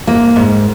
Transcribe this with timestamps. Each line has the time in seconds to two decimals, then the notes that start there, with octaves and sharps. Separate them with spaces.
0.07 G#2 A#3
0.36 G#2